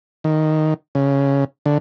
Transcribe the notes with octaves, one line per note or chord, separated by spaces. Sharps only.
D#3
C#3
D3